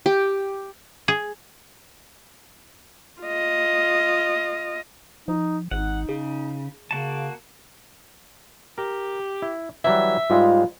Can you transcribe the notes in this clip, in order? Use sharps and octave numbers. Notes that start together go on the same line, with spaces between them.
G4
G#4
F4 D#5
F3 D#4
G#1 D#4 F#5
C#3 G#4
C#3 A#3 F#4 A5
G4 A#4
E4
E3 F#3 G3 E5
G#2 G3 G#3 F4